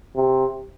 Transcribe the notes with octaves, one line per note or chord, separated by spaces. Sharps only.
C3